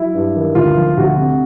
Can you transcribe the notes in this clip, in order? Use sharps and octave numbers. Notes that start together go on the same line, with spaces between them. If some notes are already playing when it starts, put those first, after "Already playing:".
Already playing: F#3 E4
G2
D#3
D2 F4
F3
D2 F#4
C3